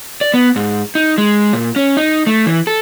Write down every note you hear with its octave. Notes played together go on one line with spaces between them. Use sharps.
D5
B3
G#2
D#4
G#3
A#2
C#4
D#4
A3
E3
A4